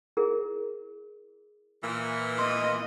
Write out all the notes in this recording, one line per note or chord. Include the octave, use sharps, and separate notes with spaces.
E4 G#4 A#4
A#2 E3
D#5 C6